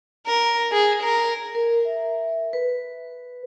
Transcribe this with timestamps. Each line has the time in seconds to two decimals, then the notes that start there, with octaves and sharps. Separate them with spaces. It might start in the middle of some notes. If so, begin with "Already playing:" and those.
0.24 A#4
0.71 G#4
1.02 A#4
1.55 A#4
1.85 E5
2.53 B4